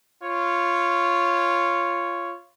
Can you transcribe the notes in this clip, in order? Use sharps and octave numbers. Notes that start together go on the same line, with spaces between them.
F4 C#5